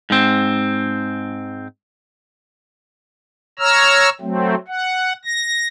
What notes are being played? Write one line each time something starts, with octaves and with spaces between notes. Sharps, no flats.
G#2 C4
C#5 A#5 E6 F6
F#3 A3 C4
F#5
A#6